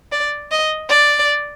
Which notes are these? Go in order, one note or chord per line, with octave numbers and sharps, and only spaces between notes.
D5
D#5
D5